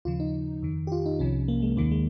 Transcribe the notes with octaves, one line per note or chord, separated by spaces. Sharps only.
D#2 C#3 F3 F4
D#4
F2 D#3
G4
F4
D#4
C2 C3 F3 C#4
A#3
G#3
D#2 D#3 A#3
G#3